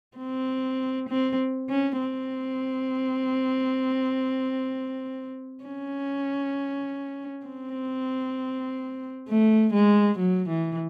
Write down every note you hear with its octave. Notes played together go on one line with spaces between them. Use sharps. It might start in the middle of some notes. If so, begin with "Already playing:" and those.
C4
C4
C#4
C4
C#4
C4
A3
G#3
F#3
E3